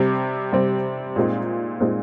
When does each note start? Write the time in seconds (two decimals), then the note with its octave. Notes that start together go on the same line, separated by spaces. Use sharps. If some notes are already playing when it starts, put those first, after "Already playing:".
Already playing: C3 G3 C4
0.53 C3 G3 C4
1.16 A#2 G#3 C4 D#4
1.80 A#2 G#3 C4 D#4